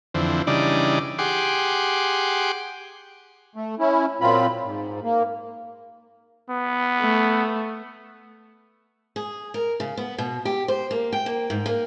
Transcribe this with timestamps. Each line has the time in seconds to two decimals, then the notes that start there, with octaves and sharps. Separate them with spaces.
0.14 F2 D3 E3 C4
0.47 C#3 E3 G3 D4 D#4 D5
1.19 G4 G#4 F#5 C6 D6
3.56 A3
3.79 C#4 E4
4.21 A#2 F#3 C4 F4 B5
4.64 G#2
5.03 A#3
6.50 B3
7.01 A3
9.16 G#4
9.54 A#4
9.80 C#3
9.97 B3
10.18 B2
10.45 G4
10.68 C5
10.91 A#3
11.12 G5
11.26 A#3
11.50 G#2
11.66 A#3